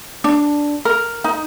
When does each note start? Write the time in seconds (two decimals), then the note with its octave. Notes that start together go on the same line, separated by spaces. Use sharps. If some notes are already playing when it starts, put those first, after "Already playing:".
0.24 D4
0.85 A#4
1.24 D#4